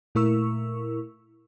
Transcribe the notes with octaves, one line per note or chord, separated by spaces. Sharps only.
A#2 A3 E4 A#4 C#6 E6